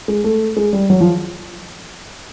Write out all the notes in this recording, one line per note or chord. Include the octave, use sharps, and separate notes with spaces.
G#3
A3
G#3
G3
F#3
F3